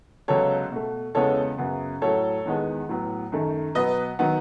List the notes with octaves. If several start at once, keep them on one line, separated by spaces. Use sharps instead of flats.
C#2 C#3 F#3 B3 A4 C#5
B2 A3
E2 C#3 G#3 B3 A4 C#5
F#2 C#3 F#3 B3
A2 F#3 A3 A4 C#5
E2 D#3 G#3 B3
A2 F#3 B3
F#2 D#3 A3
B2 F#3 B3 B4 D#5
D#3 F#3 B3